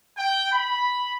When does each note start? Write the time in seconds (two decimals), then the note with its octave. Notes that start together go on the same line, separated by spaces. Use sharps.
0.17 G5
0.52 B5